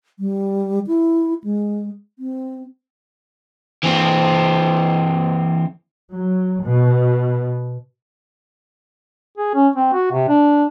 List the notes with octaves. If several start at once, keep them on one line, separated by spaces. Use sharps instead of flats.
G3
E4
G#3
C4
E3 C4
F#3
B2
G#4
C#4
C4
F#4
C3
D4